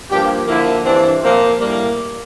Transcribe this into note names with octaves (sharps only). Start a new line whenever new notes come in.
G2 F3 A#3 G4
D3 F3 A#3 E4
G2 E3 G3 C4 D4
A#2 F3 A#3 C4
A2 G3 A#3 D4